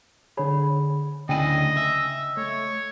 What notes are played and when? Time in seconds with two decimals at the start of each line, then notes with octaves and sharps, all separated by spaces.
0.37 D3 G#4 C#5 B5
1.29 D2 C#3 D4 E4 D#5 G5 G#5 D#7
1.77 E5
2.37 A3 C#5